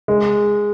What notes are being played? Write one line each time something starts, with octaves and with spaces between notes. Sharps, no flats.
G#3